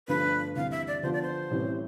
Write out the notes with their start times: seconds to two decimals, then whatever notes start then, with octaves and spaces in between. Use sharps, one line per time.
0.08 G1 G2 F3 A3 D4 B4
0.56 D2 C3 E3 G3 F5
0.71 E5
0.87 D5
1.03 D3 F3 B3 F4 C5
1.13 D5
1.22 C5
1.51 A1 A2 E3 G3 C4